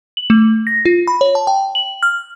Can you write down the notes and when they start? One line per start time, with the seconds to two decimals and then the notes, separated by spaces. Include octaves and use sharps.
0.17 F#7
0.30 A3
0.67 A#6
0.85 F4
1.07 B5
1.21 C#5
1.35 A5
1.47 G5
1.75 F#7
2.03 F6